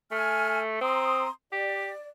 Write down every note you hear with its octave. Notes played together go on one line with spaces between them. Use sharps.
A3 G#5 F6
C4 A#5 C6 D#6
G4 D5